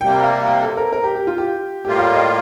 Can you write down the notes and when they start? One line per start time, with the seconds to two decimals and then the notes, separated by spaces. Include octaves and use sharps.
0.01 C3 G3 A#3 G5
0.24 F5
0.47 G5
0.62 A4
0.77 A#4
0.92 A#4
1.04 G4
1.15 G4
1.27 F4
1.38 G4
1.84 A2 G3 A#3 F4 G4
1.99 F5
2.14 D#5